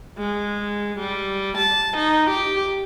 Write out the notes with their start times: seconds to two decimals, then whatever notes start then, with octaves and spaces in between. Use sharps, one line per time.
0.18 G#3
0.99 G3
1.57 A5
1.97 D#4
2.30 G4